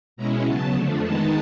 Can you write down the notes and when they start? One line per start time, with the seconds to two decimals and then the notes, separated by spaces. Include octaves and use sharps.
0.17 B2 G#3 C#4 E4 A#5
0.44 C#3 F#3 B3 A5
0.73 F2 D3 F3 A3 D4
1.01 D#3 G#3 B3 D#4 A5